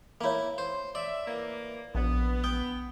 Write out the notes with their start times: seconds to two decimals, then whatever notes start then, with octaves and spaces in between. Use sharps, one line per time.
0.21 A#3 E4 C#5 F5
0.58 C5
0.95 D5 E5
1.26 A2 E3 A#3
1.95 A#1 B3
2.44 G5 D#6